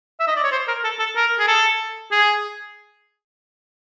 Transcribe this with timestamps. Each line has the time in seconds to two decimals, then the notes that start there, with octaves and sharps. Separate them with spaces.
0.20 E5
0.27 D#5
0.36 D5
0.44 C#5
0.52 C5
0.68 A#4
0.84 A4
0.99 A4
1.16 A#4
1.39 G#4
1.48 A4
2.12 G#4